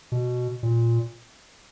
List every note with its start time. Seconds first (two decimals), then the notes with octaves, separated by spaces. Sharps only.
0.12 B2
0.63 A#2